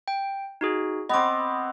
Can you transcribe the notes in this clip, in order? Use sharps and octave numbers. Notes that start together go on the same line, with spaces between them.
G5
D#4 F#4 G#4
B3 C4 D#5 D6